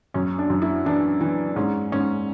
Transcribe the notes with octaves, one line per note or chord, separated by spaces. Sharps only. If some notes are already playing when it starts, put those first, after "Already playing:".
F#2 C#4
D4
F#2
E4
E3 D4
E3
G#2 C#4
G#2 C#4